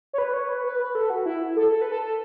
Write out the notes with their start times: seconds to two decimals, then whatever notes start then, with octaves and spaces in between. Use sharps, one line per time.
0.13 C#5
0.18 B4
0.33 C#5
0.49 B4
0.64 B4
0.79 B4
0.95 A4
1.10 F#4
1.26 E4
1.56 A4
1.72 A4
1.82 B4
1.92 A4
2.02 A4